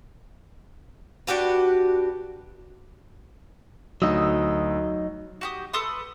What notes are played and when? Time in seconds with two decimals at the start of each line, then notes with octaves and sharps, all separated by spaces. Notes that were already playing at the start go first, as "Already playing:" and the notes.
1.27 D4 F#4 G4 B4
4.02 D2 F#3 D#4 D#6 E6
5.41 F#4 G4 D#6
5.73 A4 B4 C6 D#6